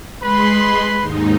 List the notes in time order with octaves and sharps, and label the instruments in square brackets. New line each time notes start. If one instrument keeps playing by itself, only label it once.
[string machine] G#3 C6 [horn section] B4 B5
[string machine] D#2 G#2 D#4